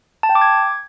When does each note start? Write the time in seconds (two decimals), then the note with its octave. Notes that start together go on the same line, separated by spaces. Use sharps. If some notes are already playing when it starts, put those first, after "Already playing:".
0.23 A5
0.29 G5
0.35 D6
0.41 G#6